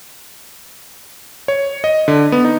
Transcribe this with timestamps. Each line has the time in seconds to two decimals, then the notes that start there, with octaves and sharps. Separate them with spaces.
1.48 C#5
1.84 D#5
2.08 D3
2.32 B3
2.45 D#4